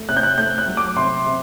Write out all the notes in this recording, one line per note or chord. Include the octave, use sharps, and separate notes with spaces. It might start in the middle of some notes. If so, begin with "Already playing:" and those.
Already playing: A3
C3 F#6
G6
F#6
A3 G6
F#6
F#3
D6
C3 C6
C3